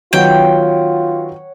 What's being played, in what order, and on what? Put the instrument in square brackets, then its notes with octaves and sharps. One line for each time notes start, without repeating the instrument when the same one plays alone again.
[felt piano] D#3 F#3 B3 [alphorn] F4 [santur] C#5 F#5 [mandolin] G5